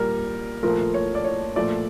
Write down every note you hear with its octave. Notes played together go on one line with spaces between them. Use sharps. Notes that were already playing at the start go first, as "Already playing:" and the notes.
Already playing: A#2 G3 A#4
A#2 F3 A3 A#4
C#5
D5
C#5
A#2 F3 A3 D5